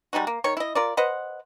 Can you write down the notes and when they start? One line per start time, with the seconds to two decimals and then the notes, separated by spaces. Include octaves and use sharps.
0.13 G3 G#3 D#4 F#4
0.27 A#3
0.44 D#3 C#5
0.57 E4 D#5
0.75 F4 A#4 D5
0.97 B4 C5 D#5 F#5